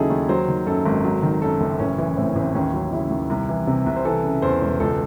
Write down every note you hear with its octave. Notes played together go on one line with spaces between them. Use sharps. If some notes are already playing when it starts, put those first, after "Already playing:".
Already playing: D#2 C#3 F#3 D#4 E4 G#4 A4
D#2
F#3 C5
D#3
F#2 A4
G#1
F#3
D#3
F#2 A4
F#1
A1 C#4
E3
A2 C4
C#4
A1
C4
D#2 C#4
F#3
C#3 E4
D#2
C2
E3
C3
C2
C5
E3 A4
C#3
E2 C5
E1
C#2 A4